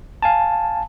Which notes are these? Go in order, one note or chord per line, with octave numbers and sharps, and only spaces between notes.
F5 G#5 A5